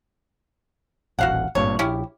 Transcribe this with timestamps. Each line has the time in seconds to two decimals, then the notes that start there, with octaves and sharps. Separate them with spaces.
1.19 D#1 A1 F#4 F5 F#5
1.55 G#1 G2 A#2 C#5
1.79 A#1 C#4 E4 G4